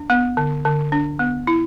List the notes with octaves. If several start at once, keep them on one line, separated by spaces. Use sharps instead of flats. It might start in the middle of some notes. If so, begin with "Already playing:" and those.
Already playing: D4
B3
D3
D3
D4
B3
E4